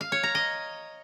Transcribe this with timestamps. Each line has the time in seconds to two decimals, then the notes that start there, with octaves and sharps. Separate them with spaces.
0.01 F5
0.12 C#5
0.23 A#5
0.35 D#5